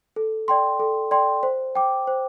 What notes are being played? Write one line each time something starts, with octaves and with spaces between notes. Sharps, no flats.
A4
D5 G5 C6
A4
D5 G5 C6
C5
G5 D6
C5